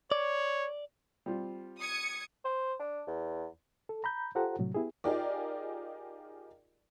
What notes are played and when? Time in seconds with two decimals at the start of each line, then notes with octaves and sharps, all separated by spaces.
0.12 C#5 D5
1.26 G3 C4 F4
1.81 D#6 G#6 C#7
2.45 C5
2.80 D4
3.07 E2
3.89 A4
4.04 A#5 B5 G6
4.35 F4 G4 A4 C5 F#5 A#5
4.59 A2 C3 F#3
4.74 B3 E4 G4 G#4
5.04 D#4 F4 G4 G#4 A#4 D5